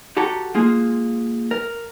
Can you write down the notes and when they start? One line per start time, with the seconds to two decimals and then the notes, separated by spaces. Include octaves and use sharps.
0.17 F#4 G4 A4 F#5 A#5
0.55 G#3 A#3 F4 G#4
1.51 A#4